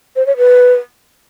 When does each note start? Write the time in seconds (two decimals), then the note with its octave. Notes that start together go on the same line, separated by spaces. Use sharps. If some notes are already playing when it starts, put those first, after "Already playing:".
0.16 C5
0.27 C#5
0.37 B4